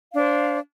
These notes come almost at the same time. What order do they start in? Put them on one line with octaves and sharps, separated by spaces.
F5 D4 C5